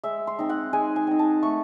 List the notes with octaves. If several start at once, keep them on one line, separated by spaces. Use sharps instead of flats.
G#3 E5
C6
C4 D#4
F#5
G#3 G#5
G#5
C4 D#4
A5
A3 C#6